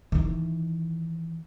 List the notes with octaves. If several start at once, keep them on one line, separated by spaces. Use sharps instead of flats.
D#3 E3